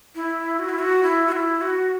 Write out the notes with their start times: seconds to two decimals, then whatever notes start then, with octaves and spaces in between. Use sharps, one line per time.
0.15 E4
0.59 F#4
0.69 E4
0.79 F#4
1.03 E4
1.27 F#4
1.32 E4
1.61 F#4